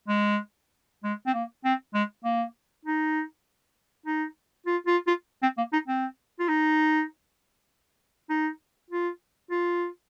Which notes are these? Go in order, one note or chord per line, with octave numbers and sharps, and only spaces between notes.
G#3
G#3
C4
A#3
C4
G#3
A#3
D#4
D#4
F4
F4
F4
C4
A#3
D#4
C4
F4
D#4
D#4
F4
F4